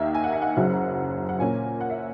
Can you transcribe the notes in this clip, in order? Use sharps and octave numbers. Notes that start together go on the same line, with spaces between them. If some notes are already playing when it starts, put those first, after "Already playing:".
Already playing: D#2 D#3 A#3 D#4 E5
G#5
F#5
E5
F#5
F#1 F#2 C#3 F#3
F#5
A#2 A#3 C#4 G#5
F#5
E5